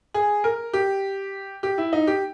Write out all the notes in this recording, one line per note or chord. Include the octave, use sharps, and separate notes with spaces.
G#4
A#4
G4
G4
E4
D#4
G4